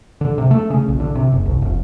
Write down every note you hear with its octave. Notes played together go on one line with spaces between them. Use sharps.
D3
C3
A3
C#3
A#1
D3
C3
F#1
C2
F1